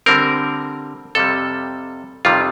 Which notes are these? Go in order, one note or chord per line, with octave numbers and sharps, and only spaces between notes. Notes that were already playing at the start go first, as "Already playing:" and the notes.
D3 G3 C4 A#4
F2 C3 G3 A4
F2 C3 D#3 G3 F4